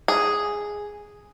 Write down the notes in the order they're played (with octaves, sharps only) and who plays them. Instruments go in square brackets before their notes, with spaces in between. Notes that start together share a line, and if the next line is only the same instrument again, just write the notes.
[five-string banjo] G#4